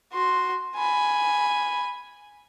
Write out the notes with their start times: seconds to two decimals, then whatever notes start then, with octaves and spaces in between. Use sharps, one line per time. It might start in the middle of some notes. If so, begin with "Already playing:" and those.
0.13 F#4 C6
0.76 G#5 B5